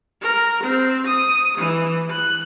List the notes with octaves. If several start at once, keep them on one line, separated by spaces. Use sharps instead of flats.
A#4
C4
D#6
E3
F#6